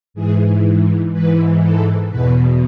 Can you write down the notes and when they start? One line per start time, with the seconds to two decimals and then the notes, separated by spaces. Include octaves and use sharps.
0.14 G#2 E3 G#4
1.12 G#2 E3 B4
1.61 A4
2.10 E2 B2 B4